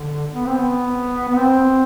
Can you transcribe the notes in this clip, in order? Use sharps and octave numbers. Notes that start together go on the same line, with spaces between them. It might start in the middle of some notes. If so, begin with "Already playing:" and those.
Already playing: D3
B3
C4
B3
B3
C4